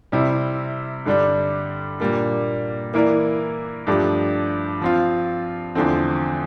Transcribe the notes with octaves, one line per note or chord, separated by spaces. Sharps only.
C3 G3 C4 E4
G2 D3 G3 D4
A#2 G3 A#3 D4
E3 A#3 E4 A#4 D5
G2 F3 A3 D4 G4
F3 C4 F4
E2 D3 F3 A3 C4